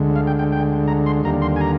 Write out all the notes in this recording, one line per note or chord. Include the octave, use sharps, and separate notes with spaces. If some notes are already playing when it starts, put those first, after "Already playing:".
Already playing: D2 D3 G#3
F5
G5
G5
G5
A#5
C6
D#2 D3 G3 A#3 A#5
C6
G#5
A#5